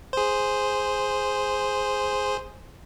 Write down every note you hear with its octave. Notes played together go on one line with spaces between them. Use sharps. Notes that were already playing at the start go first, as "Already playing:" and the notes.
G#4 C5